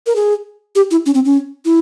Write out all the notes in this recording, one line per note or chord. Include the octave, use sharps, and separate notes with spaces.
A#4
G#4
G4
E4
C#4
C4
C#4
E4